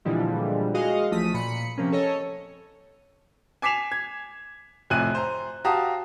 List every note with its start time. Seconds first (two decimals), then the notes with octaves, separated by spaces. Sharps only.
0.05 A#2 D3 E3 F3 G3 G#3
0.74 G#3 F#4 G#4 D#5 F5
1.11 A1 F3 A3 D#6 B6 D#7
1.34 A#2 B5 C#7
1.78 C3 F3 A#3 C#4
1.92 A4 C#5 D#5
3.62 G#5 D6 B6 C7 E7 F7
3.92 G#6
4.90 A1 F2 C3 G#5 F#6 D#7
5.15 C5 A#5
5.65 F#4 G4 F5 A5 A#5 D#6